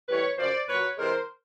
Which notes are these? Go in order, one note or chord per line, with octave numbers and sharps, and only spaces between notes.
A2 E3 G3 B4 C#5
F#2 C#3 F3 C5 D5
A#2 F#3 B4 C#5
C3 E3 G#3 A#4 C5